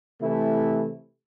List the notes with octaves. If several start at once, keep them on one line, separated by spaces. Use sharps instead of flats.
C3 E3 A3 E4